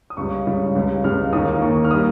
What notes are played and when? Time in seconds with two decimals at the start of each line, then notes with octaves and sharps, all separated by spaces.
0.10 D#6
0.17 C#2 C#3 G3 C#6
0.46 C#2 C#3 G3
0.75 C#2 C#3 G3
1.04 C#2 C#3 G3 F6
1.33 D#2 D#3 A#3 D#6
1.62 D#2 D#3 A#3 C#6
1.84 F6
1.91 G3 A#3 D#6